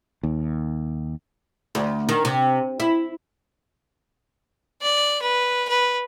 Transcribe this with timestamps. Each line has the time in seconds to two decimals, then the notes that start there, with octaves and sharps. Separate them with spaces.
0.23 D#2
1.75 D2
2.09 D#3
2.25 C3
2.80 E4
4.82 D5
5.22 B4
5.69 B4